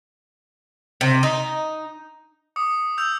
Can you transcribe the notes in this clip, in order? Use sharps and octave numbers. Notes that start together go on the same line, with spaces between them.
C3
D#4
D6 D#6 C#7
E6 G6 F7